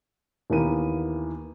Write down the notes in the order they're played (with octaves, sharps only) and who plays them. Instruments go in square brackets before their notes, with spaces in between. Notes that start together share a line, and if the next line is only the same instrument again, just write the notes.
[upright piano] D#2 E3 A#3 B3 D#7